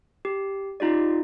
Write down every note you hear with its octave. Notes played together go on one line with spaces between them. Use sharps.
G4
D#4 F4 G4 D5